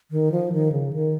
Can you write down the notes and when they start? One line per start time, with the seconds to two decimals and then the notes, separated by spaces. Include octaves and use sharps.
0.11 D#3
0.32 F3
0.52 D#3
0.72 C#3
0.93 D#3